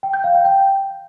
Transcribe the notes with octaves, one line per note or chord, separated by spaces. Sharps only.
G5
G6
F5
G5
G5